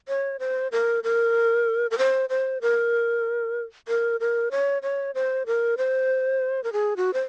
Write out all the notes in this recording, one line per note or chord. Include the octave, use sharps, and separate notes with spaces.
C#5
C5
A#4
A#4
A#4
C5
C5
A#4
A#4
A#4
C#5
C#5
C5
A#4
C5
A#4
G#4
F#4
C5